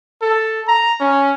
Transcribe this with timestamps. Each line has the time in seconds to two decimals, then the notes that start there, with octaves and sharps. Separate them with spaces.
0.22 A4
0.68 A#5
1.00 C#4